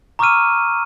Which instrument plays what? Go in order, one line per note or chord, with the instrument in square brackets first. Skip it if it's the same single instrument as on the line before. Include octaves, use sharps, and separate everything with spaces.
[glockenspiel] A#5 C#6 D6 E6 F6 D#7